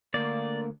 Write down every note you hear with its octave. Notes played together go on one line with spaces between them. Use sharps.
D2 A#3 A#4 D5